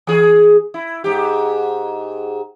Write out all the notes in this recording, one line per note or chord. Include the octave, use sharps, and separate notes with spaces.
E3 G#4
E4
G#2 G4